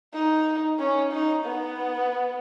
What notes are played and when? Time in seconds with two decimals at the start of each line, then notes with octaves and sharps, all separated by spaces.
0.14 D#4
0.79 C#4
1.13 D#4
1.45 B3